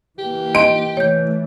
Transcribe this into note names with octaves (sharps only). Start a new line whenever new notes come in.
E3 A#3 G4
D#5 C6 D7
E3 A3 C#5 G6